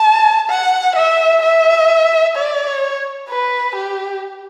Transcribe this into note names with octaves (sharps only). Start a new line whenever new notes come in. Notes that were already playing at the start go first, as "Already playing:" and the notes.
Already playing: A5
F#5
E5
E5
D5
C#5
B4
G4